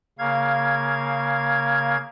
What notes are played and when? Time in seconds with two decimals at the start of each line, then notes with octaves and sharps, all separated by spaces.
0.19 C#3 A#3 F5 G#6